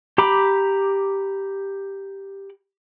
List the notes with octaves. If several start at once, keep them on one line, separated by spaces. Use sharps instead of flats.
G4 A#5 B5 D6